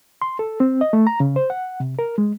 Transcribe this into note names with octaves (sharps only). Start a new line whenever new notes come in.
C6
A4
C4
D#5
A3
A#5
C#3
C5
F#5
C3
A#4
G#3